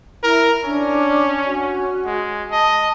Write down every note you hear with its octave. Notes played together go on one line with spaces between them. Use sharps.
E4 A#4
C#4 D4
F#4
G#3
D#5 A5